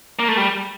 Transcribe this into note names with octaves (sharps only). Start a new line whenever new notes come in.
A#3
A3
G3